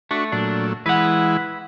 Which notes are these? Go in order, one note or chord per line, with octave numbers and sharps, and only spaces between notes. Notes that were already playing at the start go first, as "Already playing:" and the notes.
A3 D4 F#4 C#6
A#2 F#3 A3 D4
E3 G#3 E4 B4 F#5